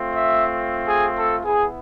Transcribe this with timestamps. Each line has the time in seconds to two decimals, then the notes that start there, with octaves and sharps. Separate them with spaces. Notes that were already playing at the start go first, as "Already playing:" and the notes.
Already playing: A3 C4 F4
0.15 E5
0.87 G#4
1.16 A4
1.45 B3 E4 G#4